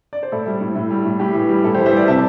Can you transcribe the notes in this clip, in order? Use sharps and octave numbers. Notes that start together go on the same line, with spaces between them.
D5
C5
A2 E4 A4
G3
A2
A2
G3
A2
A2 G4
E3
G3
A2 E4 A4
E3 G4 C5
C5 E5
G3 D5 G5
C3 E5 A5